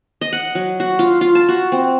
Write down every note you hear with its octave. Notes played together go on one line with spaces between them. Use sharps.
D#5
F#5
F#3
F#4
F4
F4
A5
F#4
C4